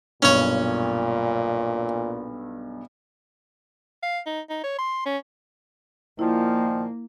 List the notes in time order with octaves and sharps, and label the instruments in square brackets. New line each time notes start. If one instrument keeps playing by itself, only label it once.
[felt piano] B1 G2 [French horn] A#2 [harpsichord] C#4 C#5
[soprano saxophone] F5
D#4
D#4
C#5
C6
C#4
[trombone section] A#2 D#3 F3 [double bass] A#3 [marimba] E4